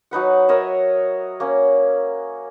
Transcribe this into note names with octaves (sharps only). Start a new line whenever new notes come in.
F#3 D#4 B4 F#5
A#4 C#5 D#5 E5
A#3 C#4